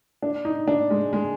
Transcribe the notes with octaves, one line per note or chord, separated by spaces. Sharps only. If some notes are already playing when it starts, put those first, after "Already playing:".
D4
D#4
D4
G#3
G#3